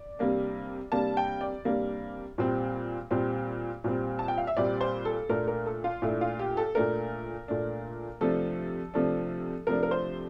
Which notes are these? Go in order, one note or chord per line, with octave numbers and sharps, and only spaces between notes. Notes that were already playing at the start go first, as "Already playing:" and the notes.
Already playing: D5
C3 G3 A#3 D4
C3 G3 A#3 D4 A5
G5
D5
C3 G3 A#3 D4
A#2 G3 C4
A#2 G3 C4
A#2 G3 C4
A5
G5
F5
E5
A#2 G3 C4 D5
C5
A4
A#2 A3 D4 A#4
A#4
A4
F4
A#2 A3 D4 E4
F4
G4
A4
A#2 A3 D4 A#4
A#2 A3 D4
C3 F3 A3 D4 A4
C3 F3 A3 D4
C3 F3 A3 D4 A#4
A#4
C5